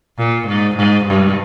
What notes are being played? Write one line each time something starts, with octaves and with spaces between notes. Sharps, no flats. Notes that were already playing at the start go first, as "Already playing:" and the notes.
A#2
G#2
G#2
G2